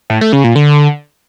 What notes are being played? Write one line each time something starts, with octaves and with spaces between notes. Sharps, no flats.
A2
A3
C#3
A#2
D3